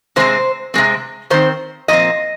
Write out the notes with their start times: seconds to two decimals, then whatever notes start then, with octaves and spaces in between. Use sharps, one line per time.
0.16 C3 G#3 C4 C5
0.74 C3 G#3 C4
1.30 D#3 C4 C5
1.88 A#2 F3 C4 D#5